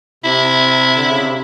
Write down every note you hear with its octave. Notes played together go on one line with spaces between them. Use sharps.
C3 E4
D3
C#3
C3